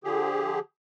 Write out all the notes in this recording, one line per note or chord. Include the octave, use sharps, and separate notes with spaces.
D3 F3 G4 G#4